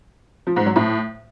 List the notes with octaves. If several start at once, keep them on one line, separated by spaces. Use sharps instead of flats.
F3
G#2
F#3
A2